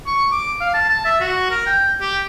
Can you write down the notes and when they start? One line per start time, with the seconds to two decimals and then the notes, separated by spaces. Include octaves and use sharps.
0.06 C#6
0.31 D6
0.60 F5
0.74 A5
0.89 A5
1.05 E5
1.20 F#4
1.51 A#4
1.66 G5
2.01 G4